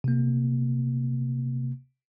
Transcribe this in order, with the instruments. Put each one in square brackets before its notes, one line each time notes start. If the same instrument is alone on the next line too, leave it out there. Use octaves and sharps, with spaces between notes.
[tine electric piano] C3 A#3